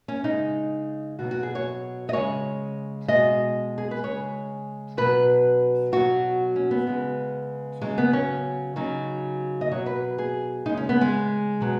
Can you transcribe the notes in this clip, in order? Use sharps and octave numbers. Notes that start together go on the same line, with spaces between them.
C#4
C#3 G#3 D#4
B2 F#3 F#4
F#4
G#4
C#5
D#5
C#3 G#3 C#5
B2 G#3 D#5
G#4
B4
C#3 G#3 C#5
B2 F#3 B4
B2 F#3 F#4
C#4
B3
C#3 G#3
C#3 F#3 G#3
B3
C#4
C#3 F#3 D#4
D#5
B2 F#3 C#5
B4
G#4
C#3 G#3 D#4
C#4
B3
G#3
B2 F#3